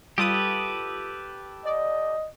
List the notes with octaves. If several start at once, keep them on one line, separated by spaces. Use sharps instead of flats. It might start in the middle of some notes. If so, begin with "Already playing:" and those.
G3 F4 G4 A4 B4 D#6
D5 D#5